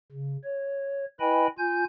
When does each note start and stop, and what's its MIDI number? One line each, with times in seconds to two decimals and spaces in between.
0.12 0.37 49
0.44 1.05 73
1.20 1.47 64
1.20 1.47 71
1.20 1.47 75
1.20 1.47 79
1.20 1.47 80
1.20 1.47 83
1.58 1.84 65
1.58 1.84 80
1.58 1.84 91